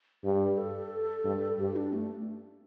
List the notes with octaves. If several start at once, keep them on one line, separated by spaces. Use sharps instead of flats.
G2 G4
A4
G2
G2 G4
D4
A3